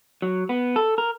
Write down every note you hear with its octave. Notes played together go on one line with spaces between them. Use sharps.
F#3
B3
A4
A#4